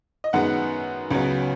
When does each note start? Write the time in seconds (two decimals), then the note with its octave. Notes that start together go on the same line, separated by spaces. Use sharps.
0.24 D#5
0.33 F#2 D#3 G#3 B3 F#5
1.11 C#2 C#3 F#3 B3